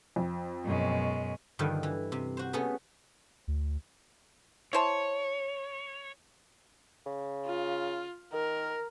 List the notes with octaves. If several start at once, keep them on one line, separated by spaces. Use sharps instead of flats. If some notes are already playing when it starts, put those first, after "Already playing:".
F2
F#2 B2 G#3
G2 D3 D#3 F3
E3
C3
F#4 C5
A3 B3 C#4 G#4 B4
D2
E4 C5 C#5 A5
C#3
F4
D#3 A#4